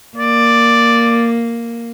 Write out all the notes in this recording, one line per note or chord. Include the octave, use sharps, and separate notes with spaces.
A#3 D5